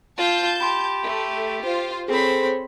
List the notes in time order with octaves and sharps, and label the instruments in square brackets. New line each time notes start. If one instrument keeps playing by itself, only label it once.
[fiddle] F4 [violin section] A5 G6
[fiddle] G4 [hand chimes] B5 C6
[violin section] A3
F4 C5 F5
[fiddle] C4 B5 [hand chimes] G#4 A4 [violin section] C5 C#5